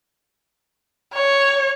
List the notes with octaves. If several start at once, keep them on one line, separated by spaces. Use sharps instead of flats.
C#5